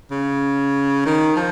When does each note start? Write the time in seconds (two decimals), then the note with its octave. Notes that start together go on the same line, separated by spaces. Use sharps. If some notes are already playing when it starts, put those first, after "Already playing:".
0.11 C#3
1.05 D#3
1.36 F3